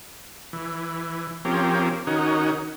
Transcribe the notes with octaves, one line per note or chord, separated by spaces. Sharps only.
E3
F3 C4 C#4 G4 A#4
D#3 C#4 D#4 F#4 A#4